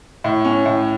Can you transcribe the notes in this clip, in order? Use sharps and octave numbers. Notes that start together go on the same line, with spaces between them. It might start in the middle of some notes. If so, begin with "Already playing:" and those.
A2
C#4
A2